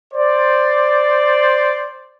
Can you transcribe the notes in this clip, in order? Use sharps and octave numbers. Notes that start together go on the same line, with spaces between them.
C5 D5